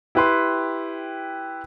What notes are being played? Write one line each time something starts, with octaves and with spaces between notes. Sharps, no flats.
E4 G4 B4 G5 C6